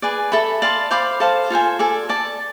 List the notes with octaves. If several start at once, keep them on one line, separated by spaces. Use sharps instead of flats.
G#4 B4 D5 G#5
A4 E5 B5
D5 F5 A5 C6
C5 F5 B5 D6
A4 C5 F5 A5
F4 A4 C5 G#5
A4 D5 G#5
A4 D5 A5